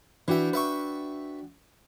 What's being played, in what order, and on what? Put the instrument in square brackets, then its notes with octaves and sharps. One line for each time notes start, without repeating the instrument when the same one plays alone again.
[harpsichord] E3 E5 [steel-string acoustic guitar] D4 F#4 G5
[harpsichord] B4 E5 C#6